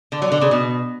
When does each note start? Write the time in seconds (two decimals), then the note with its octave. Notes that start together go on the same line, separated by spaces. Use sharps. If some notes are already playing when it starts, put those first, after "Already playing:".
0.12 D3
0.22 F#3
0.32 D3
0.41 C#3
0.51 B2